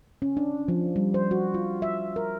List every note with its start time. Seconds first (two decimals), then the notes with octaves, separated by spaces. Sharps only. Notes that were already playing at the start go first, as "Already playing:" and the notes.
0.22 C#4
0.37 D4
0.68 F3
0.96 G3
1.14 C5
1.31 F#4
1.54 F4
1.82 E5
2.16 A#4